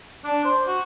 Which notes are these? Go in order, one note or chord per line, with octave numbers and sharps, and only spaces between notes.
D4
C5
F#4